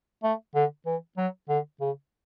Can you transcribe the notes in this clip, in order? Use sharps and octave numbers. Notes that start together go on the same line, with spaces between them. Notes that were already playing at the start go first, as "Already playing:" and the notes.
A3
D3
E3
F#3
D3
C#3